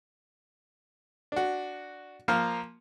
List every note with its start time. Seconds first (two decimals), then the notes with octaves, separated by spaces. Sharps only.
1.32 D4 F#4
2.28 F3 A#3 F5